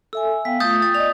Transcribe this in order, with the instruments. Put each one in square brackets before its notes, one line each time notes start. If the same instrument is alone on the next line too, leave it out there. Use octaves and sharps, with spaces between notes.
[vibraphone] A4 E5 G#5 [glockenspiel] E6
[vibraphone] B3 F5 G5 [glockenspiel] B6
[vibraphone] A3 F4 [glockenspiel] D#6 G6 A6
[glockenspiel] A6
[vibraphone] D5 D#5 [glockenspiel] F7